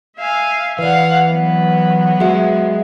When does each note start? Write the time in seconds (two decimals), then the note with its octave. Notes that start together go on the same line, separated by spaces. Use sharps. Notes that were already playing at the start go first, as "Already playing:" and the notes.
0.17 E5 F5 G#5
0.79 E3 B4 D5 F5 F#5
1.27 F#3 B3
2.20 G#3 F#4 G#4 E5